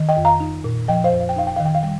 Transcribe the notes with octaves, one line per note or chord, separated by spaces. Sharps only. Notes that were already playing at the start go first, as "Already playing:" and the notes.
Already playing: D#3
D#5 G5
F2
F5 A#5
D#4
A#2
F3 D#5 G5
C5 F5
F2
F5
G5
D#4 F5
G5
D#3 F5
G5
F5
G3 G5